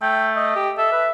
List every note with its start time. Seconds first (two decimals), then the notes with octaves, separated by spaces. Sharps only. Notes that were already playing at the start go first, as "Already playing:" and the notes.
0.02 A3 G5
0.36 D#5
0.56 G4
0.78 A4 E5
0.92 B4